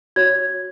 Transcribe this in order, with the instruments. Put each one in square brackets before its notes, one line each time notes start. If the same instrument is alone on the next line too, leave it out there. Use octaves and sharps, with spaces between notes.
[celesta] F#4 C#5 G#6